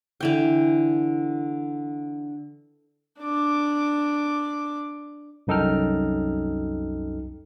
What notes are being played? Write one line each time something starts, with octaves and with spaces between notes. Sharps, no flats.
D3 E3 G5
D4 D6
C2 F#2 D#4 A4 G5 F6